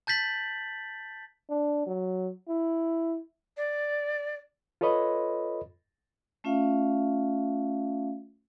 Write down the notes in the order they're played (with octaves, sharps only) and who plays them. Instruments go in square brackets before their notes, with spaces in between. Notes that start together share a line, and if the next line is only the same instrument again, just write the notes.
[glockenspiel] A5 G6 A6 B6 F#7
[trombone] D4
F#3
E4
[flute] D5
[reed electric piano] F4 A4 B4 C#5 D#5 B5
[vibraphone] A3 C#4 F4 E5 F5